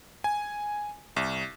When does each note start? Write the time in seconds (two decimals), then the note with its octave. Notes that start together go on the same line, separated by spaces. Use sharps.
0.24 G#5
1.16 C2